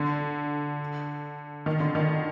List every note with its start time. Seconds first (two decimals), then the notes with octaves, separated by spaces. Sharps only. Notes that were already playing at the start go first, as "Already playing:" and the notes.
Already playing: D3
1.66 D#3
1.80 D3
1.95 D#3